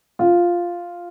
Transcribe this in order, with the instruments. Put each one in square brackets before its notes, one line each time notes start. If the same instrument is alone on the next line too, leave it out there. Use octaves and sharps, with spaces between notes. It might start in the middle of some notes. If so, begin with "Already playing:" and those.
[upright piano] F4